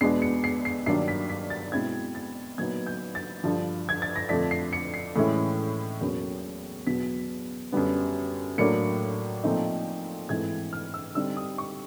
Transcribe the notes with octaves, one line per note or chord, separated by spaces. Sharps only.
E2 B2 G#3 B3 D4 C7
C#7
C7
C7
G2 D#3 F#3 A#3 D4 C7
B6
B6
A6
B2 G#3 C4 E4 G#6
A6
A#2 F#3 B3 D#4 G#6
G6
A6
G2 D3 F3
G#6
A6
A#6
F2 D3 F3 A3 D4 B6
C7
C#7
C7
A2 E3 G#3 C#4 E4
E2 B2 F#3 A#3 C#4
E2 B2 F#3 B3 B6
F#2 D3 G3 B3
A2 F#3 A#3 D4 C#7
A#2 F3 A3 C4 D#4
G#2 E3 A3 C4 E4 G#6
F6
E6
D3 G3 C4 D#4 E6
D#6
C#6